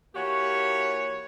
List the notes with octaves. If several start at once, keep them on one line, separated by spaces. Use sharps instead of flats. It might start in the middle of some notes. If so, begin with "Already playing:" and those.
E3 A#3 F#4 G4 C#5